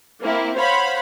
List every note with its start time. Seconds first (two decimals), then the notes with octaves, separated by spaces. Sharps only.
0.22 A#3 C4 E4
0.57 C5 C#5 F5 F#5 B5